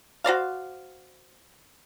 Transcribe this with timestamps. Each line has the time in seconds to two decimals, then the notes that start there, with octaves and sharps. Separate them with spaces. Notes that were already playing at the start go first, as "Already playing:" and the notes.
0.24 F#4 C5 D5 F5